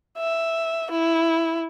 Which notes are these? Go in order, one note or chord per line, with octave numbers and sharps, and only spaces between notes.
E5
E4